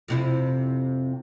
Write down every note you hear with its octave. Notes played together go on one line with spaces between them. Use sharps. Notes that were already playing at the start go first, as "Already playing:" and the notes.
F2 C3 E4